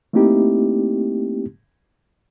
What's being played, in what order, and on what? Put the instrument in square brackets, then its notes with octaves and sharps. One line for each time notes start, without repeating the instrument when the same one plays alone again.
[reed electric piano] A3 A#3 C4 D#4 E4 G4